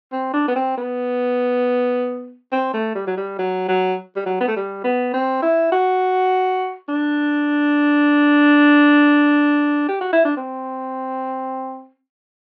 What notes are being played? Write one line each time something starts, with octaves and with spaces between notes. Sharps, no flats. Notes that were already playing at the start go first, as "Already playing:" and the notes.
C4
D4
B3
C4
B3
C4
A3
G3
F#3
G3
F#3
F#3
G3
F#3
B3
A3
G3
B3
C4
E4
F#4
D4
G4
F#4
E4
D4
C4